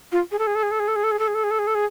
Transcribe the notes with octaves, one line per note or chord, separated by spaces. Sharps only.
F4
G#4
A4
G#4
A4
G#4
A4
G#4
A4
G#4
A4
G#4
A4
G#4
A4
G#4
A4
G#4
A4
G#4